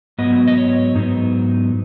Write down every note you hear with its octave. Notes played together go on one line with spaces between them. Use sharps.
G#2 F#3 B3 D#5
D#5
C#5
G#2 F#3 B3 D#4